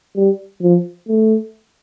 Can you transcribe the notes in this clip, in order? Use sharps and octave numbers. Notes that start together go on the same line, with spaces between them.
G3
F3
A3